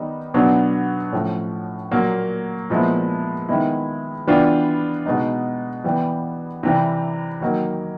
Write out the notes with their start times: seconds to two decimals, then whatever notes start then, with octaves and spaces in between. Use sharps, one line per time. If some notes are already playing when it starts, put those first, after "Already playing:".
Already playing: D#3 G3 B3 D#4
0.34 B2 F#3 B3 D4
1.12 A2 F3 A3 C#4
1.91 A#2 F#3 A#3
2.70 A#2 F3 G#3 B3 E4
3.49 D#3 G#3 B3 E4
4.27 E3 G3 B3 D4 F4
5.06 B2 G#3 B3 D#4
5.84 E3 G3 B3
6.63 C3 E3 G3
7.41 D#3 F#3 A#3 D#4